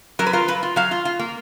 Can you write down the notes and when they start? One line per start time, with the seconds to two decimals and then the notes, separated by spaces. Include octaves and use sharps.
0.19 F#3 A#4
0.27 B4
0.33 F4 A#4
0.48 F#3 B4
0.63 F4
0.76 F#3 F5
0.91 F4
1.05 F4
1.19 A#3